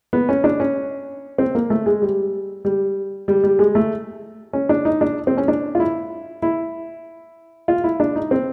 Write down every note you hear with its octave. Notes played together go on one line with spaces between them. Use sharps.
B3
C#4
D4
C#4
C4
A#3
A3
G#3
G3
G3
G3
G3
G#3
A3
C#4
D4
D#4
D4
C4
C#4
D4
F4
E4
E4
F4
E4
D4
D#4
C4